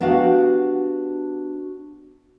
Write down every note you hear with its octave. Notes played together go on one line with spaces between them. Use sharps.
B3 D4 F#4 G4 F5